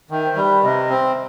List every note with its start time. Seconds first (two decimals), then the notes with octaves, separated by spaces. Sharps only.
0.10 D#3 E5 G5
0.24 C5
0.36 G3 B4
0.62 C3 B4 D#5
0.89 C4 C5 E5